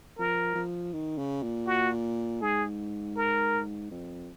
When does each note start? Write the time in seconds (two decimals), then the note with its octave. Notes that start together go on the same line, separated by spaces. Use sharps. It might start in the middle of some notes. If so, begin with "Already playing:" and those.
0.18 F3 A#4
0.55 F3
0.93 D#3
1.18 C#3
1.43 A#2
1.67 F#4
2.42 G#2 G#4
3.17 A#4
3.91 F2